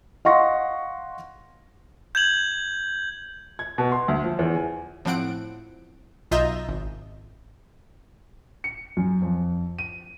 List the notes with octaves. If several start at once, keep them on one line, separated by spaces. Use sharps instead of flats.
D#5 F5 F#5 C6 C#6 A#6
G6 G#6 F#7
G#6
B2
C6
D2
F3
E2
G#5
A2 F3 C4 F#5 D7
B1 F4 D#5 E5 A#5 G6
G#1
C#7
F#2
F2
D#7